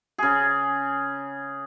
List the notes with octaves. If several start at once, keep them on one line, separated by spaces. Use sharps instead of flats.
C#3 G#4